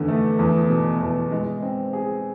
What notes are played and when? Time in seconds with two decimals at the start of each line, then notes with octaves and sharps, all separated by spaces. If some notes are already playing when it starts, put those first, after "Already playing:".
Already playing: E2 D3
0.08 A3
0.39 E2
0.70 B2
1.01 E2
1.31 G#3
1.62 C4
1.93 G#4